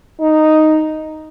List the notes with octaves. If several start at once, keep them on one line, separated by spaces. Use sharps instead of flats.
D#4